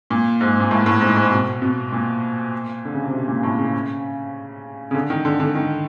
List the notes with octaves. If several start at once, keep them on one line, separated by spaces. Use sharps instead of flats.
A#2
G#2
A#2
A2
A2
G#2
G#2
B2
B2
A#2
D3
C#3
C3
B2
A#2
A2
C#3
C#3
D3
D#3
D3
D3
D#3